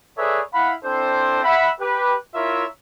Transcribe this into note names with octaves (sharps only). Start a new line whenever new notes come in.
G#4 A4 B4 C#5 D5 E5
E4 F5 F#5 B5
C4 D4 E4 A4 C5
E5 F#5 B5
G4 B4
E4 F4 A#4 C#5 E5